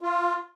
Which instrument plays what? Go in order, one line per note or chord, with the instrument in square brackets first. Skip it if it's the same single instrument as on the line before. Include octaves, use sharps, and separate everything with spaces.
[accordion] F4